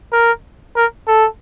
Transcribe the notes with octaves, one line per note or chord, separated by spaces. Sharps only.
A#4
A#4
A4